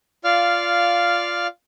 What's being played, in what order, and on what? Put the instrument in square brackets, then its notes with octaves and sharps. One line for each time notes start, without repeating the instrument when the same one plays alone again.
[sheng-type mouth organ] F4 D5 F5 F6